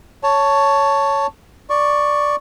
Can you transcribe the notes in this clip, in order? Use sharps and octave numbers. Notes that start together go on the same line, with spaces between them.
C#5 A5
D5 C#6